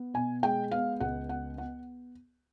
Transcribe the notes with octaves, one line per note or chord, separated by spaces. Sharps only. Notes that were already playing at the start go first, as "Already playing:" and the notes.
Already playing: B3
B2 G#5
G#3 G5
B3 F5
C#2 F#5
B3 F#5
B3 F#5